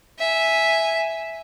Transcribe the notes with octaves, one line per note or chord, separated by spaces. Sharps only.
E5 G#5